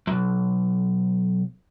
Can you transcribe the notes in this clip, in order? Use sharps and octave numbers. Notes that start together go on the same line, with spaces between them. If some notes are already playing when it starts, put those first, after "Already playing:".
B1 F#2